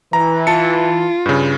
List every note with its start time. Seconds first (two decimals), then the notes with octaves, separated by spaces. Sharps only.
0.13 E3 A#5
0.47 F4 A5 C#7
1.26 G2 C#3